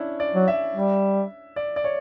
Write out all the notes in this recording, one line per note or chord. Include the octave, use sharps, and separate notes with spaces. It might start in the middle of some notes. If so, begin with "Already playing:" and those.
Already playing: C#4 D4 E4
D5
F#3
E5
G3
D5
D5
C#5